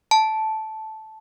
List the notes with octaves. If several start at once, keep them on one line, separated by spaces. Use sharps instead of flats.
A5